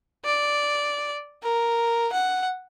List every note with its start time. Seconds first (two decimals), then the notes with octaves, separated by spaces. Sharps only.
0.25 D5
1.43 A#4
2.13 F#5